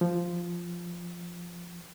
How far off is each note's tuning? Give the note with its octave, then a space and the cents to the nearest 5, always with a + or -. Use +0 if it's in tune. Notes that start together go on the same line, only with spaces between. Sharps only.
F3 -5